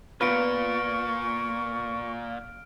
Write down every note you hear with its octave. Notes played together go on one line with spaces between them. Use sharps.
A#2 B3 F4 B4 C#6 F6 D7